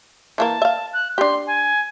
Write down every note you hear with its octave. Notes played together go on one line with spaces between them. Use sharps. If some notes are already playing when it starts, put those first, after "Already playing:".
E3 A#3 A#4 A5
E5 F5
F#6
D4 G4 C6
G#5